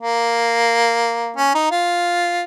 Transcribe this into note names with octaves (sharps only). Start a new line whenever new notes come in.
A#3
C#4
D#4
F4